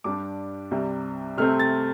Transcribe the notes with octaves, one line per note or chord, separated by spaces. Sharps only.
G2 G3 D4 D6
C2 C3 G3
C3 A3 C4 F6
A6